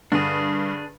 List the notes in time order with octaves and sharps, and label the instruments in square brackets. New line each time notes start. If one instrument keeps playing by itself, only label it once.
[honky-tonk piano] G2 [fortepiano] D3 [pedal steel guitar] D4 G#4